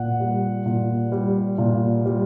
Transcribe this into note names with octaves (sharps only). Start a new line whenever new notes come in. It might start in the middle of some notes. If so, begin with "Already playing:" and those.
Already playing: A#2 F#5
G3
A#2
G3
A#2
G3